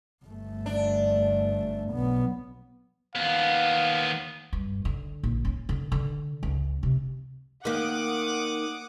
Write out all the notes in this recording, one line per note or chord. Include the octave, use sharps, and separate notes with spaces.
G1 A3
D4
B1 B3
D#2 B3 F5
G2
D3
A#1
C#4
D3
D3
C#2
C3
D#3 A#3 F#5 D6 D#6